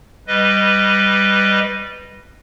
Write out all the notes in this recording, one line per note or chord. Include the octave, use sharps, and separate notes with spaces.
G3 B4 D#5